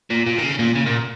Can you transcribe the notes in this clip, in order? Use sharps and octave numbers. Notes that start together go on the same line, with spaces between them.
A#2
A#2
D#3
C#3
A#2
C#3
A#2